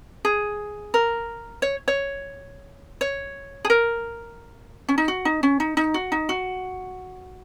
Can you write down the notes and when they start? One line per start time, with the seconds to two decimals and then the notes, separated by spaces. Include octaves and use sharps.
0.25 G#4
0.94 A#4
1.62 C#5
1.88 C#5
3.01 C#5
3.65 G#4
3.70 A#4
4.89 C#4
4.98 D#4
5.08 F#4
5.25 D#4
5.43 C#4
5.60 D#4
5.77 D#4
5.94 F#4
6.12 D#4
6.29 F#4